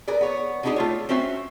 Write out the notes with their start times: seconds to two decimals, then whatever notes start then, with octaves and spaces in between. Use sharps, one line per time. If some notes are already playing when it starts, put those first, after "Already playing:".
0.08 G#4 A#4 B4 D5
0.21 B3 C#5
0.63 C#3 G#3 D4 D#4 G4 G#4
0.76 A3 F4 C#5
1.09 C4 C#4 F#4 C5 E5 G#5